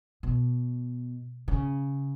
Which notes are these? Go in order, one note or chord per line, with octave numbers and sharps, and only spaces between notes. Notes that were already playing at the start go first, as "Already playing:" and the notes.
B2
C#3